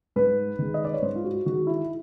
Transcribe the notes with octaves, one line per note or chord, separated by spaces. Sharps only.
G#2 B4
D#3 G#3
D#5
D5
C#5
G#2 C5
F4
F#4
D#3 G#3 F#4
E4